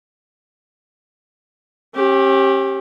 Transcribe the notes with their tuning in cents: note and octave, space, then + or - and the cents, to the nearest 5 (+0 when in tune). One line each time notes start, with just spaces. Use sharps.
C#4 -40 G4 +0